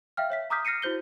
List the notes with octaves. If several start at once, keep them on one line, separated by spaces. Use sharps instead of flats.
E5 F5 G5 F6
C#5 E5 B6
A#5 D6 D#6 F6 G6 B6
F6 A#6 C7 C#7 D#7
E4 F#4 C5 G6 G7